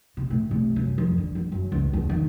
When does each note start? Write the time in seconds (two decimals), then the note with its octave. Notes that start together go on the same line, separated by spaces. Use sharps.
0.17 C3
0.30 A2
0.51 C3
0.76 F#2
0.98 F2
1.18 D3
1.35 F2
1.52 F#2
1.72 C#2
1.93 E2
2.09 D#3